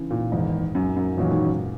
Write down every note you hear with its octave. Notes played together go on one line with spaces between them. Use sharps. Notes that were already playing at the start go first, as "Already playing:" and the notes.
Already playing: C#3 E3
A#2
F#1 E2 G#2 D#3
F#2
F#2
E2 A#2 D#3 F#3 C#4 F#4
G#2
F#2